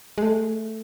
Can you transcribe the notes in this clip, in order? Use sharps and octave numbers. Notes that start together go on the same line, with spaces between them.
G#3
A3